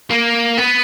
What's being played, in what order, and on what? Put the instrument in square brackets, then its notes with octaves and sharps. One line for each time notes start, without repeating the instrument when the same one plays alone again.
[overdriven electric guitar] A#3
B3